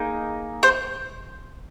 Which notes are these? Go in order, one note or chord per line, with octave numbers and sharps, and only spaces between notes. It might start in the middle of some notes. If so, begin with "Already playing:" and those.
Already playing: A#3 D#4 G#4
C5